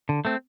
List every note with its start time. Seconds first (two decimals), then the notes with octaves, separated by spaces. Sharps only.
0.09 D3
0.25 A3 C4